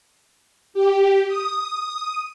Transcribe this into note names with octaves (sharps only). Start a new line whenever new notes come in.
G4
D#6